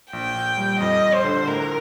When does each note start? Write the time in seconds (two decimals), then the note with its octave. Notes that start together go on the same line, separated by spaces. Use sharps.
0.12 A#1 G5
0.35 A#1
0.57 G3
0.80 F2 D#5
1.03 F2
1.14 C5
1.24 D3
1.47 A2 A#4